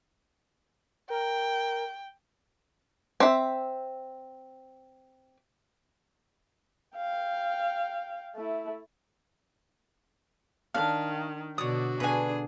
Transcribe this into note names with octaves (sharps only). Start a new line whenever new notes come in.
A#4 G5
C4 E5
F5 G5
A3 E4
D#3 D4 F5
B2 D3 D4 F#4 C#5 D5 D#6
B2 D3 D4 G#4 B4 G#5